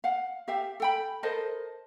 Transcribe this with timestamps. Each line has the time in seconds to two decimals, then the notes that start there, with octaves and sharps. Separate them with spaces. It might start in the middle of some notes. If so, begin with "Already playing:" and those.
0.04 F5 F#5
0.48 G4 E5 F5 G5
0.80 A4 G5 B5
1.23 A4 A#4 C5 D#5